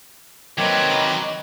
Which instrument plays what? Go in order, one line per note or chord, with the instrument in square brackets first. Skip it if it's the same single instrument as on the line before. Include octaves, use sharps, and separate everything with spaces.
[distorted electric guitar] D#3 B4 [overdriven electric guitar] F#3 [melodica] A#3 C4 D6 [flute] D#5